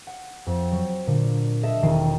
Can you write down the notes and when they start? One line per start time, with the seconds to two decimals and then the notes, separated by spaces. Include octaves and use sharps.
0.07 F#5
0.47 F2
0.72 F#3
1.07 A#2 D3
1.63 A4 D#5 E5
1.82 E1 D#3 G5 C7 D#7